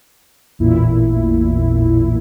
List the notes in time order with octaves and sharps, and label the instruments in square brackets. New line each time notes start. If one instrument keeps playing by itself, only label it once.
[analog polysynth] A1 E2 A#2 E4